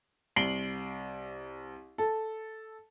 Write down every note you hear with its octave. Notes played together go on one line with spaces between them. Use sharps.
C2 C7 D7 F#7 G7
A4